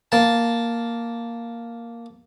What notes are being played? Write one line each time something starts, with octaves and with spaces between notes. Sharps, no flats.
A#3 A5